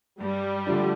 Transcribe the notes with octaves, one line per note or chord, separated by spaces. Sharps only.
G2 G3
D3 F3 A3 D4